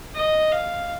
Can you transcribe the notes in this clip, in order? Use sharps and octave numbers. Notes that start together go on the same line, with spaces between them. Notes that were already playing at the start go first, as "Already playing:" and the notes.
D#5
F5